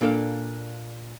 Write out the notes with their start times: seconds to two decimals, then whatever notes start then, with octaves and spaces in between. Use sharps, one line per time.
0.01 A#2 A#3 D4 A4 C#5 F5